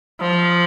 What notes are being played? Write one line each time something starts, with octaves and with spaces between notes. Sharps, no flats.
F3